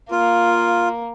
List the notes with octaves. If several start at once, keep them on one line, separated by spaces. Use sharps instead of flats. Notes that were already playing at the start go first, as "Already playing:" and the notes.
A#3 F4